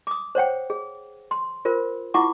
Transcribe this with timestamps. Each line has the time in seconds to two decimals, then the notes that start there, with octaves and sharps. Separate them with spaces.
0.07 D6 D#6
0.35 C5 C#5 F#5 G5
0.70 G#4
1.31 C6
1.65 F4 A#4 C5
2.14 E4 F4 F#5 C#6 D6